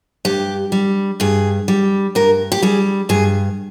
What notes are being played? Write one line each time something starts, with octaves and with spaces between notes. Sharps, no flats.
G2 G4
G3
G2 G#4
G3
G2 A#4
G4
G3 G#4
G2 G#4